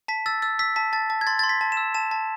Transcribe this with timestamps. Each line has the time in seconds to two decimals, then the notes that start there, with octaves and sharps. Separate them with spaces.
0.08 A5 B6
0.26 E6 A6
0.42 E6 A6
0.59 E6 B6
0.76 A5 B6
0.93 A5 A6
1.10 A5
1.21 G#6
1.27 C6 A6
1.39 C6 A6
1.49 B6
1.61 A5
1.72 E7
1.77 E6
1.94 A5 E7
2.11 A5